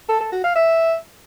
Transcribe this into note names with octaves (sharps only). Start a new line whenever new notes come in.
A4
A4
F#4
F5
E5